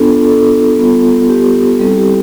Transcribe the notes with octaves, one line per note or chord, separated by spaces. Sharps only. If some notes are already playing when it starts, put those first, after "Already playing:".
Already playing: B3 D4 F4 A4
A4
G3 B3 F4
G4
G3 C4 E4 A4
G4